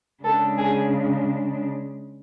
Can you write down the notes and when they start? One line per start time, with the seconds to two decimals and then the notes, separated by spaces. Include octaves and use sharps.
0.24 C#3 G#3 D4 A4
0.58 G#4